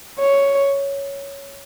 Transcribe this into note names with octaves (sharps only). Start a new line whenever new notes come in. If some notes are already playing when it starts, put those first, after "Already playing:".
C#5